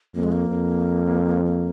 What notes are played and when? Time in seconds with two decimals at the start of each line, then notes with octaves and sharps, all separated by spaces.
0.15 F2 A#3
0.23 G#3
0.32 A#3
0.48 F2
1.45 A#3